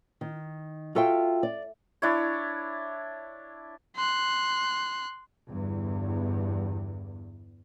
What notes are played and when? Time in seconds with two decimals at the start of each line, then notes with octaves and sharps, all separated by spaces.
0.21 D#3
0.95 F4 F#4 A4 E5 F5 G5
1.43 D5
2.02 D4 E4 C#5
3.96 C6 F#6
5.48 G1 E2 G2